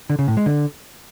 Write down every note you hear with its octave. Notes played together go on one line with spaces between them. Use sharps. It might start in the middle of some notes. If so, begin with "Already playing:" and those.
D3
C#3
A2
G#3
D3